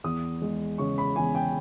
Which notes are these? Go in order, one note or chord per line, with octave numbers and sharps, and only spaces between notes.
E2 D#6
G#3
C#3 C#6
B5
E2 G#5
G5